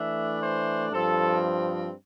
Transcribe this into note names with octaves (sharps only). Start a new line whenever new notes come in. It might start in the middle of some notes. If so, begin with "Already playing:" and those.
Already playing: E3 A3 D4 E5
C5
G2 F3 C4 A4